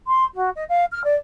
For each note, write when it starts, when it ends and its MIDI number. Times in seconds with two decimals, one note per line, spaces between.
0.07 0.25 84
0.35 0.50 66
0.56 0.64 75
0.69 0.85 77
0.92 1.03 89
1.04 1.15 74